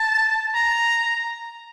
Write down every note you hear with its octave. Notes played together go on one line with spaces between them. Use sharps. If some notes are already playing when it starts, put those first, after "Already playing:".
Already playing: A5
A#5